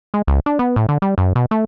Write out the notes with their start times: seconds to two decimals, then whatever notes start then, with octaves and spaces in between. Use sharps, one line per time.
0.14 G#3
0.27 C#2
0.46 D4
0.59 B3
0.76 A2
0.89 D3
1.02 G3
1.18 F#2
1.35 B2
1.51 A3